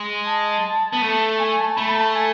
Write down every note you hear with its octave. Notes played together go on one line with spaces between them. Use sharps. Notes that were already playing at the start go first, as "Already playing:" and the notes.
Already playing: G#3
A5
B3
A3
G#5
A5
A5
A3 B5
B5
A5
G#5